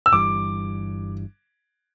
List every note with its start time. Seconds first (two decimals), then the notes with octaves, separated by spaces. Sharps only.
0.06 E6
0.12 G1 G2 E3 G3 D6